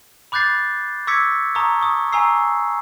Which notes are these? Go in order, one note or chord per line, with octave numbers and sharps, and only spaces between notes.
B5 D6 F#6 G6 A6 C7
C#6 D6 E6 G#6 B6 C#7
A5 A#5 C#6 D#6
C#6 D#6
G#5 A#5 C#6 E6 C7